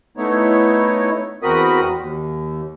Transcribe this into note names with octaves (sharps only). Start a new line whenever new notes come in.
A3 B3 D#4 E4 C#5
E2 C4 F#4 A#4 B5 D#6
D#2